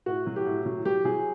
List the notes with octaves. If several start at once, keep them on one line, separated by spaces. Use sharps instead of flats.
A2 F#4
F#3
G4
A2
F#3
F#3 G4
F#3 G#4